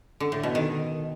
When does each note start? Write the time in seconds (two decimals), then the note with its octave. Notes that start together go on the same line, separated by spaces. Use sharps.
0.20 D3
0.32 A2
0.43 B2
0.55 D#3